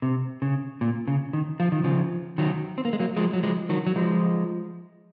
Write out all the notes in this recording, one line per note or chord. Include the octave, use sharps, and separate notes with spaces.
C3
C#3
A#2
C#3
D#3
F3
D#3
C#3 F3
D#3 F#3
C4
A#3
G#3
F#3 A#3
F3 G#3
F#3
F3 G#3
D#3 F#3
F#3
F3 G#3